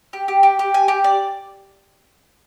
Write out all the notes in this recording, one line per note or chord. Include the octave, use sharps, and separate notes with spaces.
G4
G4
G4
G4
G#5
G4
D5